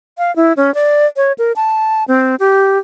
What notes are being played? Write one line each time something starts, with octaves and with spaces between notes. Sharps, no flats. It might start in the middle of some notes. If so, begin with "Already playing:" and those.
F5
E4
C#4
D5
C#5
A#4
A5
C4
G4